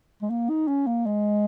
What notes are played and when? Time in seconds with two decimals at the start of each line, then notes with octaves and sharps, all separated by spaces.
0.22 G#3
0.30 A#3
0.50 D#4
0.68 C#4
0.87 A#3
1.06 G#3